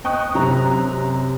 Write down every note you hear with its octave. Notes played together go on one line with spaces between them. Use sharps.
D#5 G5 C#6 D#6 F#6
F#2 C3 A#5